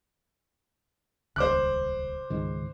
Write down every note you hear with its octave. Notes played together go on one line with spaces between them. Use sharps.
D#1 C#2 C5 D6 F#6
C#2 G#2 D#3